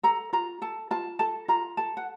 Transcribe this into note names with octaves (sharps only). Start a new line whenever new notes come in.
A4 A#5
F4 A#5
A4 A5
F4 A5
A4 A5
F4 A#5
A4 A5
F#5